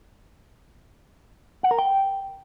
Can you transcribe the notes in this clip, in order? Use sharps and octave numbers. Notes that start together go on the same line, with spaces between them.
F#5
A#4
G5